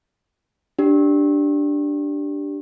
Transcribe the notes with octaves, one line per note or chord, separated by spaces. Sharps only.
D4 G4